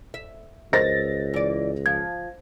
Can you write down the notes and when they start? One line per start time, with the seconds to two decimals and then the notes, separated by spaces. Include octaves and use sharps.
0.14 E5
0.73 C#2 A#4 C5 D#5 A6 A#6
1.34 E3 D5
1.86 F3 G#6